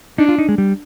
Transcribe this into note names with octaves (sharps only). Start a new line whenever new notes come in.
D4 D#4
F4
D#4
G#3
G3